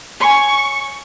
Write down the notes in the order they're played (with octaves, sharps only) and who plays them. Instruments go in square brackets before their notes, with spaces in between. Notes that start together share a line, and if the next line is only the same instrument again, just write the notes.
[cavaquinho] C#5 G#5 [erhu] C#6